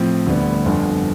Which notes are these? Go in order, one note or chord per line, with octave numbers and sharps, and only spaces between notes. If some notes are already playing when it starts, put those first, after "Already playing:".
Already playing: A2 F3 C4
D2 D3 G3 B3
G1 F2 D3